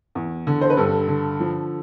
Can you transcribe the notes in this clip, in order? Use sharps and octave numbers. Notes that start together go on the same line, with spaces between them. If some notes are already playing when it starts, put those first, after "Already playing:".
E2
D3
C5
B4
G2 A4
D3
F3